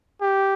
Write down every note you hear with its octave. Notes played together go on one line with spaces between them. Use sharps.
G4